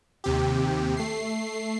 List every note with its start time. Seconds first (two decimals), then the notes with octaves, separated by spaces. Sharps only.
0.24 D#2 C3 G4
0.97 A3 C7